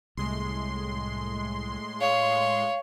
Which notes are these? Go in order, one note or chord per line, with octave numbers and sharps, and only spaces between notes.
C2 A2 G#3 C6
C#5 F5